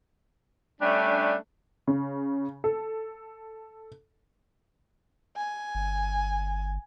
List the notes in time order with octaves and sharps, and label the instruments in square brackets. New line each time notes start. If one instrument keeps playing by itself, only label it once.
[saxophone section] G3 A3 C#4 D4
[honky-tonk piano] C#3
A4
[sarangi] G#5
[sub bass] G1